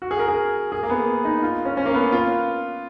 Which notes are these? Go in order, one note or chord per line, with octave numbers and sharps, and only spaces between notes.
F#4
G#4
A#4
G#4
G#4
A#3
B3
D#4
F4
C#4
C#4
A#3
B3
F4